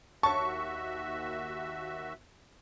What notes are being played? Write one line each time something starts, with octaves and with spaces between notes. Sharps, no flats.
D#2 F#4 C#5 E5 A5 C#6